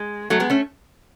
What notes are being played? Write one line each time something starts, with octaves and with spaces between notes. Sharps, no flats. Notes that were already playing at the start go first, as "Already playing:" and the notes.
Already playing: G#3
F#3 A3
G#3 B3
A3 C#4